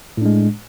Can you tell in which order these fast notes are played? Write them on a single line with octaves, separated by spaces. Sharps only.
A2 D4 G#3